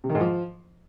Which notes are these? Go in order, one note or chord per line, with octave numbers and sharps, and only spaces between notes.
C3
D#3
G#2
F3